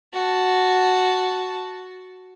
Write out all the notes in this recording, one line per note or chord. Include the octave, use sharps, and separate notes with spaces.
F#4 A5